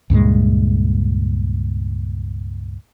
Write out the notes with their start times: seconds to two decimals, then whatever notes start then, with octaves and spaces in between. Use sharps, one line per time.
0.10 C#2 G2 A#2 G#3